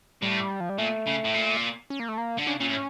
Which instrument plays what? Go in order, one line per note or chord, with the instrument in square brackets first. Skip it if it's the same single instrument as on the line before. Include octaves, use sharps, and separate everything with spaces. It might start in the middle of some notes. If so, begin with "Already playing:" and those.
[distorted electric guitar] A2 [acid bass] G3
[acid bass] F3
G3
[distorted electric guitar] A#2 [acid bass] A3
[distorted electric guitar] C#3
A2
A#2
[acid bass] C#4
A#3
A3
A#3
[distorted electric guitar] D3
[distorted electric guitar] C#3 [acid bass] D4
[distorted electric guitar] A#2 [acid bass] C#4
[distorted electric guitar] A2